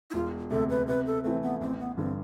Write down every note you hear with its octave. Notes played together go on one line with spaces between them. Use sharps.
E4
E1 F4
D2 C3 A4
B4
C3 B4
A4
E3 A3 C4
B3
A1 C4
B3
G2 D3 C4